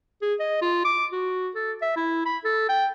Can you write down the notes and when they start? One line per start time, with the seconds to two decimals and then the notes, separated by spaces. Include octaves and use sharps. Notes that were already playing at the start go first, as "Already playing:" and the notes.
0.22 G#4
0.40 D#5
0.62 F4
0.85 D6
1.13 F#4
1.55 A4
1.82 E5
1.96 E4
2.26 B5
2.44 A4
2.69 G5